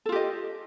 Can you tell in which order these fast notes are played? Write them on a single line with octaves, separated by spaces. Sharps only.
A4 F4 G4 D#5